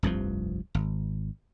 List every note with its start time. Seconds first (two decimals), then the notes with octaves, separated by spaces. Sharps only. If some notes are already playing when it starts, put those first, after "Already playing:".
0.03 F1 C2 G2 F3
0.75 G#1